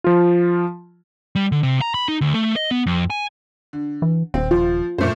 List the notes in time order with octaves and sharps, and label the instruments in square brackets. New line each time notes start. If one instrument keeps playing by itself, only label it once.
[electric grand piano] F3 F4
[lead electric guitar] G3
D3
C3
A#5
B5
D#4
D2
A3
D#5
B3
F2
G#5
[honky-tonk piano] D3
[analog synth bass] E3
[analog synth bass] D#1 [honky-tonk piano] C4
[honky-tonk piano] F3 [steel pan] F4
[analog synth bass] F#2 [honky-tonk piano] A#2 A3 C5